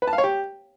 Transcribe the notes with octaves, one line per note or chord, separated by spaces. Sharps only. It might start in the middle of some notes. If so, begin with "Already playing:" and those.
B4
A5
F5
C#5
G4